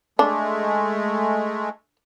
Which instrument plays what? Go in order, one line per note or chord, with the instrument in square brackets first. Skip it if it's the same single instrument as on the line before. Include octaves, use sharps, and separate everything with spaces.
[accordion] G#3 A3 [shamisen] D4